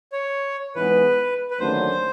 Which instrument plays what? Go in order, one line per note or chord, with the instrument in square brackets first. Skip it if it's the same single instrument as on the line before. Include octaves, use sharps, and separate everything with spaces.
[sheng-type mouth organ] C#5
[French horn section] G#2 E3 G#3 B3 [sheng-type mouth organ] B4
[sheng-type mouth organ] B4
[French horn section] D#2 D3 F#3 A3 C#4 [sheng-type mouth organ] C5